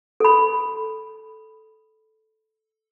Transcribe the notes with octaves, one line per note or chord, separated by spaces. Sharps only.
A4 B5